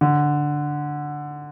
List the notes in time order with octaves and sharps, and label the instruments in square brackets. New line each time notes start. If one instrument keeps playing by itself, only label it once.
[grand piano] D3